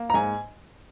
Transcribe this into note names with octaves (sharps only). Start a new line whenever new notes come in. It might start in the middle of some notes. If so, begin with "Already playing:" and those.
Already playing: A#3
A#5
G#2 G#5